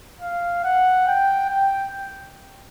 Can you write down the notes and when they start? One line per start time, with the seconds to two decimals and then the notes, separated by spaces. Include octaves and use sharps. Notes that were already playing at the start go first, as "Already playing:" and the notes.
0.21 F5
0.64 F#5
1.07 G5
1.50 G5